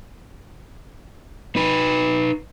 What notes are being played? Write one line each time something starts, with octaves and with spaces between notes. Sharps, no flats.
D#4 B4